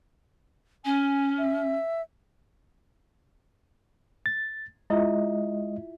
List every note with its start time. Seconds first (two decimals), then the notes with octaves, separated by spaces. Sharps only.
0.85 C#4 G#5
1.38 E5
4.26 A6
4.90 G#3 E4 F4 D#5 E5